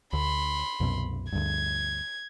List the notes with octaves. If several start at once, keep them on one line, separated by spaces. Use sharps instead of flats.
D2 B5 C6
C2 F#2 B2
D2 G2 G#6